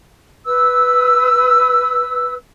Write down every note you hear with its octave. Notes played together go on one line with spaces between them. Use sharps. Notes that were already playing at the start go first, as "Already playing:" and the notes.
B4 E6